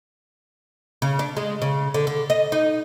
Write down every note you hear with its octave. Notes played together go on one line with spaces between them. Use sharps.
C#3
D4
G#3
C#3
D3
D3
D#5
D#4